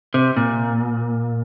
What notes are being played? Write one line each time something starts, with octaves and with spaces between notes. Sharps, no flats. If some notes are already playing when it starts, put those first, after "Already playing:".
C3
A#2